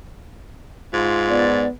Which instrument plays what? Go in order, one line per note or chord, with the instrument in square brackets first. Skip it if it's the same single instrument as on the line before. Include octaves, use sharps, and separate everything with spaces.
[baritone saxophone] G#2 [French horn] F4
[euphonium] B3 [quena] D5